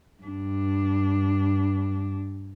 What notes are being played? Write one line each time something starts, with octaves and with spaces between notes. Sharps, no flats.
G2 D4